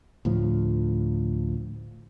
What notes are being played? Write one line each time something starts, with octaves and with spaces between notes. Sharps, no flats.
D2 A2 F3